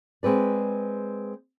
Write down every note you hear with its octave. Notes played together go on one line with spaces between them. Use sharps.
G#3 C4 B4 D5